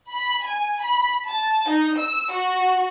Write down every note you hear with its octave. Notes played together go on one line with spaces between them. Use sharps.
B5
G#5
B5
A5
D#4
E6
F#4